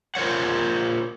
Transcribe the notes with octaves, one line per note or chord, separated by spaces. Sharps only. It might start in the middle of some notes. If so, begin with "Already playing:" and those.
F4 A#4 C5 C#5 F#5